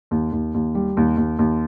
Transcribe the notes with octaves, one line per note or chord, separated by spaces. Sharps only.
D#2
D#2
D#2
G3
D#2
D#2
D#2